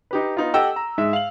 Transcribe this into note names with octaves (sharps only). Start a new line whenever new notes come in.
D#4 G4 B4
B3 D#4 F4
G4 A4 D#5 F#5 G5 E6
A#5
G#2 G#3 E5
F5 F#7